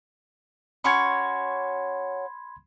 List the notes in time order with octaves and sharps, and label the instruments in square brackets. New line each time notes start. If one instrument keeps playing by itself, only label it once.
[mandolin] C#4 F#4 C#5 [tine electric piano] B5 C6 G#6